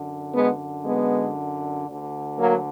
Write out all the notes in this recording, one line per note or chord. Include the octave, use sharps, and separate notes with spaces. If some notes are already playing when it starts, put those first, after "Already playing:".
Already playing: F#2 D3
G#3 B3
G#3 B3
D2 D3
F#3 A#3